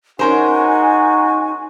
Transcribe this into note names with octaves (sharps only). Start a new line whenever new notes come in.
G#3 C#4 D#4 F#4 A#4 C5 G#5